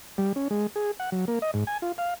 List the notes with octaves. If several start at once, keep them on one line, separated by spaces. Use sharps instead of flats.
G3
C#4
G#3
G#4
F#5
F#3
A#3
D#5
G#2
G#5
F4
F5